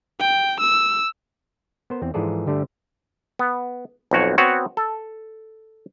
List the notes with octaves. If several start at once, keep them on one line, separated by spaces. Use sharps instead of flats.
G5
E6
B3 A#4 C5
E2 C4
G#2 E3 F3 G#4 A4 D5
G2 D3 G3 A3
B3
B1 F2 F#4 C#5
B3 C4 F#4 C#5
A4